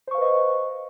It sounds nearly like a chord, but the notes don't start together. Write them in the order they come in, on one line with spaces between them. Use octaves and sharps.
C5 C#6 F5 B4 D#5